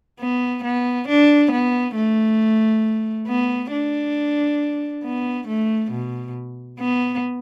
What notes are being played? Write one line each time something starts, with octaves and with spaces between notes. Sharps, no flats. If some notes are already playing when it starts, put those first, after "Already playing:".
B3
B3
D4
B3
A3
B3
D4
B3
A3
B2
B3